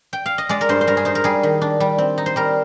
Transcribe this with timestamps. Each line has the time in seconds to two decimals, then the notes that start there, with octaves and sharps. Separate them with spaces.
0.13 G5
0.26 F5
0.38 D#5
0.49 G#3 D5
0.61 A#4
0.69 G2 C5
0.81 C5
0.87 G2 A#4
0.97 G#4
1.05 D#4 C5
1.15 A#4
1.24 G3 G#4
1.43 D#3
1.62 D4
1.80 G3
1.98 C4
2.18 D#4
2.26 C5
2.36 G3 A#4